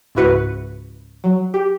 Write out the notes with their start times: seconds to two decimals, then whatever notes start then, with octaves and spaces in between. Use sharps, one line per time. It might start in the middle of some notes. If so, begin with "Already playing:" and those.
0.15 C#2 G#2 E4 F#4 B4 C#7
1.24 F#3
1.54 G4